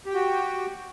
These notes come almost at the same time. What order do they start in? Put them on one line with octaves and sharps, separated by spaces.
G4 G5 F#4